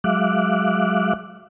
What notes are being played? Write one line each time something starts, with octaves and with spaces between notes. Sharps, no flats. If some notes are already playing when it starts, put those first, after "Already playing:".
F#3 G#3 E5 F5 D6 F#6